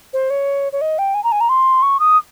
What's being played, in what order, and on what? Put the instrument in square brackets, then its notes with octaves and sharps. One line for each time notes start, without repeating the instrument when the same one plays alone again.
[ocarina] C5
C#5
C#5
D#5
G5
G#5
A#5
G#5
A#5
C6
C#6
D#6